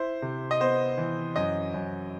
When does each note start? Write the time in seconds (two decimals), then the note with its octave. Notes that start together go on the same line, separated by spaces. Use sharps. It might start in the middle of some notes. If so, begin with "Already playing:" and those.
Already playing: E4 C5
0.22 C3
0.51 D#5
0.60 B3 C5
0.98 E3
1.36 F#2 D#5
1.74 F#2